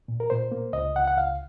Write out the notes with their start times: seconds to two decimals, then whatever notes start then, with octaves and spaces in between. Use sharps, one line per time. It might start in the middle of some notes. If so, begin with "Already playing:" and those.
0.08 A#2
0.20 A#4
0.30 A#2 C5
0.52 A#3
0.73 C#2 D#5
0.95 C#2 F#5
1.07 F#5
1.17 C#2 F5